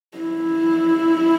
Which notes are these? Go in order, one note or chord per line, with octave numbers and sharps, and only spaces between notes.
E4